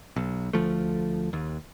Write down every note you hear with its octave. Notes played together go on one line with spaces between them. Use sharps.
B1
D2 F3 A3
D#2